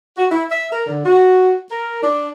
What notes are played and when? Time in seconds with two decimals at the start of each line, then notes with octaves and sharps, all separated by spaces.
0.17 F#4
0.31 E4
0.51 E5
0.71 A#4
0.87 D3
1.05 F#4
1.71 A#4
2.02 D4